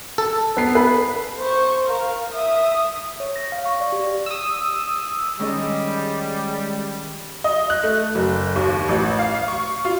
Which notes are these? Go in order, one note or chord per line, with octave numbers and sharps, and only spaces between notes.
A4
B3 C7
B4
C5 C#6
A#4 F5
E5 D#6
C#5
A#6
F5
C#6
D5
G4
D#6 E6
D#3 G3 G#3 C#4 D#5
D#5
F#6
A3
F#1
D#2
A1
F5
C#6
F4